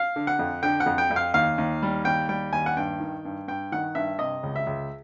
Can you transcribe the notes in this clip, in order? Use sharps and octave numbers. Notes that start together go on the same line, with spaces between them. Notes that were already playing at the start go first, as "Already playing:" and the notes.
Already playing: F5
D3
F#5
F2
D3 G5
F#5
F2
G5
F2
F5
D#2 F5
D#2
G3
D#2 G5
G3 G5
D#2 G#5
F#5
G2 G5
D#3
G2
G2 G5
D#3 F#5
G2 E5
C3 D#5
C#2
E5
C#2